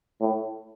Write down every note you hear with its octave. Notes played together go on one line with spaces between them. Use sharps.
A2